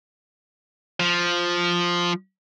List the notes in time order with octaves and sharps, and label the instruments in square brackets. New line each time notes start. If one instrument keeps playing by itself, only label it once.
[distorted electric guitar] F3